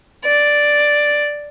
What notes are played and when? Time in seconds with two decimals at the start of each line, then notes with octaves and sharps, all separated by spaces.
0.24 D5